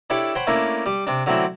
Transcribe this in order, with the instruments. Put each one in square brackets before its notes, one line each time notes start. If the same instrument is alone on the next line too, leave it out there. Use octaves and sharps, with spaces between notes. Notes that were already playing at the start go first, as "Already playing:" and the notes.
[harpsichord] D4 E4 G4 A4 C#5
C5 C#5 F#5 G5 B5 C6
A3 A#3 C#4 D4 E4
G3 G4
C3 D4
D3 F#3 A3 C4 D4 E4